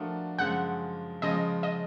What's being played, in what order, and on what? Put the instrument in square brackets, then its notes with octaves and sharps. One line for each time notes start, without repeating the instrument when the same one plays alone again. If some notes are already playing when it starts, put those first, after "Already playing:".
Already playing: [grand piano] F3 A3 D4 F#4 A#4
[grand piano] F#2 C#3 F3 G#3 [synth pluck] F#5
[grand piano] C#3 F3 G#3 [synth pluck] D#5
[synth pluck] D#5